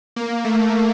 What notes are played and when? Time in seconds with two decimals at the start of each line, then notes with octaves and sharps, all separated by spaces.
0.16 A#3
0.44 A3